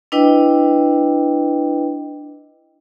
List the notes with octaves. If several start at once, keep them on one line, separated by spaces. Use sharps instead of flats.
D4 E4 B4 D#5 G5